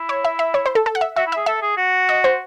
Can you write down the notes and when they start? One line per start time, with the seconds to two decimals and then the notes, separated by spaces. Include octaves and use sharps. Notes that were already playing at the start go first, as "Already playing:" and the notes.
Already playing: E4
0.09 C#5
0.25 E5
0.39 E5
0.54 C#5
0.66 C5
0.75 A4
0.86 A4
0.95 F#5
1.01 E5
1.16 F#4 E5
1.27 E4
1.32 G#4 E5
1.46 A4 E5
1.62 G#4
1.77 F#4
2.09 D#5
2.24 C5